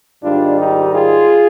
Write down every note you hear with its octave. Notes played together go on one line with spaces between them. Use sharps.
G#2 D#3 G3 D4 F4
D#4 G4
F4 G#4